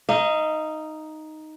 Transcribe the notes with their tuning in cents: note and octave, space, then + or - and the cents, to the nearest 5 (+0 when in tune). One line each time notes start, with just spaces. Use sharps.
D#4 +0 F5 -40